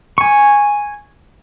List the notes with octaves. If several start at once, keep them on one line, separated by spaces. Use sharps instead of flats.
G#5 C#6